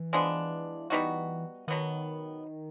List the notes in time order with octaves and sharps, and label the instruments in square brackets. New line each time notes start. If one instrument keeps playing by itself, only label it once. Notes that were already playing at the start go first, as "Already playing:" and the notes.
Already playing: [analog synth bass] E3
[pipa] F3 G#3 B3 D4
G3 B3 D#4 F#4
[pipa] B2 F#3 B3 [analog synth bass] D#3